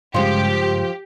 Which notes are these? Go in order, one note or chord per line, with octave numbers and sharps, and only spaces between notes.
G2 C#3 F3 G#3 F4 G4